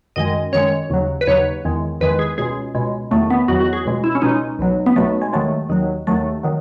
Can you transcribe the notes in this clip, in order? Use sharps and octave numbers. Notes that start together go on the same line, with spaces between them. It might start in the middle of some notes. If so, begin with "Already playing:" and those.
F#2 D#3 G#3 D#5
F#2 D#3 G#3 C#5
D#2 C#3 F#3
B4
D#2 C#3 F#3 C#5
E2 D#3 G#3
E2 D#3 G#3 B4
G#4
C#2 B2 G#3 G#4
C#2 B2 G#3
E2 D#3 F#3 A3
B3
E2 D#3 F#3 F#4
F#4
G#4
C#2 B2 G#3
E4
C#4
C#2 B2 G#3 D#4
B1 B2 F#3
B3
B1 B2 F#3 A3
G#3
D#2 D#3 F#3 A3
D#2 D#3 F#3
D#2 D#3 F#3 A3
D#3 F#3